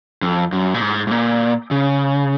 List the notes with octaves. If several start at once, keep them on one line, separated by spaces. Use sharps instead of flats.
F2
F#2
A#2
G#2
G#2
A#2
C#3